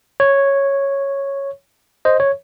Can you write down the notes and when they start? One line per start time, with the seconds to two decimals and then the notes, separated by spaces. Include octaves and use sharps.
0.20 C#5
2.05 C5 D#5
2.20 C#5